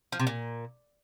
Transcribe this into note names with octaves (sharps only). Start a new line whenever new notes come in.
F3
C3
A#2